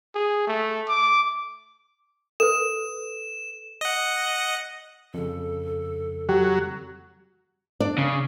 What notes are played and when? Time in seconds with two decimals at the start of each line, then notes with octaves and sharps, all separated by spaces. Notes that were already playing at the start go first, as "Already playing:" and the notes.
0.15 G#4
0.47 A3
0.88 D6
2.40 A4 B4 E7
3.81 D#5 F#5
5.14 F2 C#3 A4
6.29 F#3 G4
7.80 D4 D5
7.98 C#3